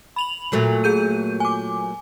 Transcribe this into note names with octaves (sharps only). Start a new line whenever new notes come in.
B5 F7 F#7
A#2 F#3 A3
G#4 G6 D#7
G#5 D6